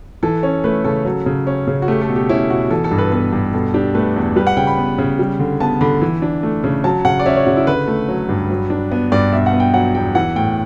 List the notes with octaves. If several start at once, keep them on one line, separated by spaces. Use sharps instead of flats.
E3 A4
C#4
A3 B4
C#3 A4
F#3
C#3
C#4
C#3
F#4
A3 G4
A4
B2
G4
C#4 E4
B2 F#4
E3 A4
A4
G2
B4
B3 B4
G2
B2 A4
D4 G4
A3 B4
E2
G3 B4
F#5
C#3 G5
B5
B3
C#3
G3
D3
B3 A5
D3 B5
E3
D4
A3
C#3
F#3 A5
C#3 F#5
D5
C#4 E5
C#5
C#3 F#4
E4
D3 B4
A3
F#3
G2
F#3
D4
B3
G2 D5
B2 E5
F#5
B3
G5
F#3 F#5
E2 G5
E3 F#5
A2 G5